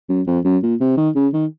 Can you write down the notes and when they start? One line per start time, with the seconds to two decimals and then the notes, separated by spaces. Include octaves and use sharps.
0.09 F#2
0.27 F2
0.45 F#2
0.63 A#2
0.80 C3
0.97 D#3
1.15 C#3
1.33 D#3